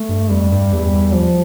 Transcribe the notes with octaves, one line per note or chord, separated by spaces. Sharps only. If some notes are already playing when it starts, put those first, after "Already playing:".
Already playing: A3
G2
F2 G3
G2
E2 G3
E2
F3